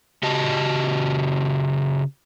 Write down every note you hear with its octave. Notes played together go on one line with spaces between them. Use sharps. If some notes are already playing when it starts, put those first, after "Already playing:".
C#3 F#4 G4 D#5 A5